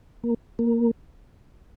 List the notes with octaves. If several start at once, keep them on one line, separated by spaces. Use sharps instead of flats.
A#3
A#3